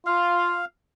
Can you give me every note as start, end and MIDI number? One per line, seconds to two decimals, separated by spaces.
0.06 0.60 65
0.06 0.65 77